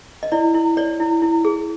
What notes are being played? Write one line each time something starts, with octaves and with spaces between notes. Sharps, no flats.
D#5
E4 D5
E4
C#5 D5
E4
E4
G#4